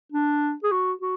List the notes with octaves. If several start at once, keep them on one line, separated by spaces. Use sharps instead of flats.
D4
G#4
F#4
F#4